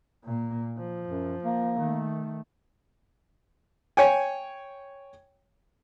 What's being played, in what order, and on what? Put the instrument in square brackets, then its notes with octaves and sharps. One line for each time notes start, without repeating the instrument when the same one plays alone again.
[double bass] A#2 A#3
F3
[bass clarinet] F#2
A#3
[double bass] D#3 A3
[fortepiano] C#5 G5 G#5